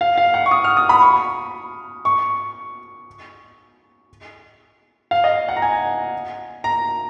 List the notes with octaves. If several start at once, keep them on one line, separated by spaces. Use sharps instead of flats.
F5
F5
F#5
C#6
D#6
F6
D#6
B5
C#6
C#6
F5
D#5
F#5
A#5
G#5
A#5